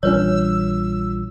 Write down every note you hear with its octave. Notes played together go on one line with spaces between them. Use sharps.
A#1 E3 G3 D4 F4 B4 C#5 E6